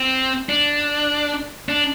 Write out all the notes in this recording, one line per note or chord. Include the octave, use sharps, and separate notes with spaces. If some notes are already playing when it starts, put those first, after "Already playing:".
Already playing: C4
D4
D4